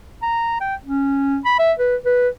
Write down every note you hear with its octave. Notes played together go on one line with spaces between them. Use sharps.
A#5
G5
C#4
B5
E5
B4
B4